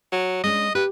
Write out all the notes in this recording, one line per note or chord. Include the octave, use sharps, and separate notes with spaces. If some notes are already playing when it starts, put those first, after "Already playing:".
F#3
G#3 C#4 D4 D#5
G4 B4